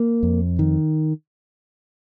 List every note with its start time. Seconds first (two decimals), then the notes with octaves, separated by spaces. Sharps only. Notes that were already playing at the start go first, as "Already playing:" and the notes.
Already playing: A#3
0.23 F2
0.59 D#3